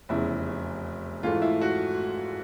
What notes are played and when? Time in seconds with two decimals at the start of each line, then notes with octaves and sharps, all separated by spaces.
0.09 F1 E2 C#3 E4
1.23 G#2 E3 A3 F4
1.42 E4
1.61 F#4